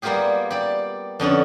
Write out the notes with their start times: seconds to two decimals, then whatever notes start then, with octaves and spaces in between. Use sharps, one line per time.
0.02 G3 A#3 B3 F4 G4 G#4
0.50 G4 D5
1.20 F2 D3 B3 C#4